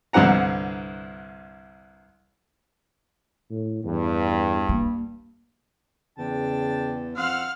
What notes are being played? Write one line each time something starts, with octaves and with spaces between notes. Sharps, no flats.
C2 G2 D3 C4 F#5 A#5
A2
E2 G2
A#3
E2 C#3 D4 G5 A5
F2 F5 F#5 C6 E6 F6